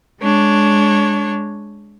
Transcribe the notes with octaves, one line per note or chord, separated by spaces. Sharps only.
G#3 D4 C#5